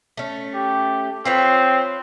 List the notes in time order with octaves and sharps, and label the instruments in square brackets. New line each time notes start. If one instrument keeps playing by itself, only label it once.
[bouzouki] A3 C#4
[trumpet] G4
[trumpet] C4 [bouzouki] F4 B4 C#5